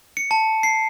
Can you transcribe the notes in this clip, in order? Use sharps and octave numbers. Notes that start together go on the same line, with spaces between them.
C#7
A5
C7